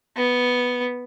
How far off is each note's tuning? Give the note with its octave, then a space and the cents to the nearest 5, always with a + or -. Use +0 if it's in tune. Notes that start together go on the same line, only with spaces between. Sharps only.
B3 +0